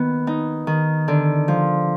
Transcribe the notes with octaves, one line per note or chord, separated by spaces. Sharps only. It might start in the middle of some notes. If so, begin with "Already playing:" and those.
Already playing: D#3 B3
D#4
D#3
D3
F3